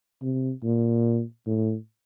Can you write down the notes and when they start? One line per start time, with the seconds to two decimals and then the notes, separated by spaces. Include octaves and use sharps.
0.22 C3
0.64 A#2
1.46 A2